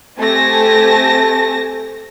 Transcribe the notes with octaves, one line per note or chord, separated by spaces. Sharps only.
A3 C4 G4 G#5 A5 A#6